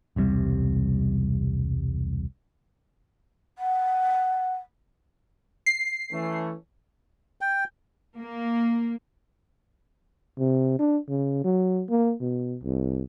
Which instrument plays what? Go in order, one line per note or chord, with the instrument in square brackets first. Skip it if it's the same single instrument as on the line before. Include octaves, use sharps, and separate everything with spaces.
[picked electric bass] E1 C2 C3 G3
[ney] F#5
[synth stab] C7
[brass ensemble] E3 A3 C#4
[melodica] G5
[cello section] A#3
[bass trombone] C3
D4
C#3
F#3
A#3
B2
C2